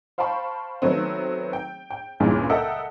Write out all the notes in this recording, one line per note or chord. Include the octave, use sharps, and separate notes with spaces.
C5 F5 G5 A5 B5 C#6
D#3 F#3 A3 B3 C4
G5
G5
C#2 G2 A#2 C#3 E3 G#3
A4 A#4 D#5 E5 F#5 G5